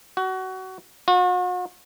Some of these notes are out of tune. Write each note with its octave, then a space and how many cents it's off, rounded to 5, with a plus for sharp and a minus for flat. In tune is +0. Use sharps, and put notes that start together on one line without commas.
F#4 +25
F#4 -40